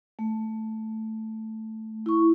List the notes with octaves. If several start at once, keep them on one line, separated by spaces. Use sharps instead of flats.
A3
E4 C#6